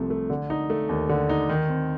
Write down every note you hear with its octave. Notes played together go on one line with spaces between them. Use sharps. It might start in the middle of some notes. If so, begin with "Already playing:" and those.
Already playing: C2 C3 F3 A3
A3
D3
D#4
A3
D#2
D3
D#4
D#3
C4